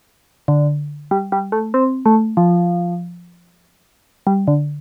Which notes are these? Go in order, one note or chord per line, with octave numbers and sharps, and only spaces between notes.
D3
G3
G3
A3
C4
A3
F3
G3
D3